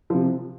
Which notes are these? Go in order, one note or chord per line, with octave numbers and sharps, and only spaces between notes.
C3 F3